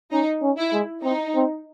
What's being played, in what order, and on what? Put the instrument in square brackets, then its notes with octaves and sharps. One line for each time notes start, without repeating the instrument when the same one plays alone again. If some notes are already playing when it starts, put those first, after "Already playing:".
[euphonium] C#4 [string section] D#4
[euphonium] C#4
[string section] E4
[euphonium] G#3
[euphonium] C4 [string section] D#4
[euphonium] C4